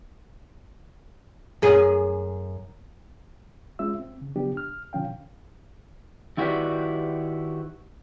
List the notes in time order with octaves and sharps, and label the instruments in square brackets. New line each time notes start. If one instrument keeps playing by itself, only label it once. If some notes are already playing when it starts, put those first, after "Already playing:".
[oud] F#2 G#4
[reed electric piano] G#3 C#4 F4 E5 E6
C4
C#3
C#3 F3 F#3 B3 D4 G4
F6
B2 D3 F3 C#4 F5 G5
[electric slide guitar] D#3 E4 F#4 G4 B4 D5